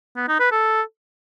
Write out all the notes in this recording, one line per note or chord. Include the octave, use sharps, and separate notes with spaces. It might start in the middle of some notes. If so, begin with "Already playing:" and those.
B3
D#4
B4
A4